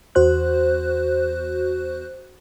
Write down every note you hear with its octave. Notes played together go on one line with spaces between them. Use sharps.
E2 F#4 C5 F#6